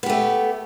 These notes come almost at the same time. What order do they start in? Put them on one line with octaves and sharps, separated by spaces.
B3 G4 A3